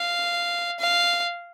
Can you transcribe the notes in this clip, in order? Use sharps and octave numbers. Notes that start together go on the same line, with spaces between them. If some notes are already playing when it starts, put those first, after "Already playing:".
Already playing: F5
F5